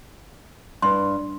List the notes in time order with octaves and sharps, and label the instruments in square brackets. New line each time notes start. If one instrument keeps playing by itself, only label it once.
[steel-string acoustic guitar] G2 [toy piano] C6